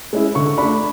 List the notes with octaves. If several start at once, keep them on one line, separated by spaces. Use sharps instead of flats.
G#3 C#4 E4
D3 C#6
A3 D4 B5